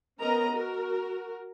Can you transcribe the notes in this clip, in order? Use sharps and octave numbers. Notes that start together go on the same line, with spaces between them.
B3 C#4 A#4 D#5 A#5
F#4 A#4